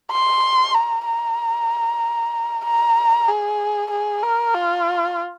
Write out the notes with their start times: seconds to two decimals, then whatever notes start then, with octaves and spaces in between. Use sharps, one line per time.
0.11 C6
0.74 A#5
1.06 A#5
2.64 A#5
3.28 G#4
3.91 G#4
4.23 A#4
4.54 F4